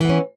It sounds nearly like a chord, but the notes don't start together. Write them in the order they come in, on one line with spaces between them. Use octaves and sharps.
E3 B3 C#4